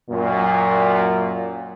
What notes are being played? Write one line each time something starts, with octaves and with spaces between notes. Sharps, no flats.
F#2 A#2